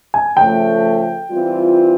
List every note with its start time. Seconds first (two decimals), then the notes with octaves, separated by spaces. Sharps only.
0.14 G#5
0.37 C#3 F3 A3 G5
1.29 E3 G3 C4 F4